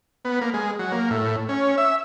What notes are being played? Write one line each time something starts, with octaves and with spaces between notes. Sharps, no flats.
B3
A#3
G#3
F#3
A#3
A2
C#4
E5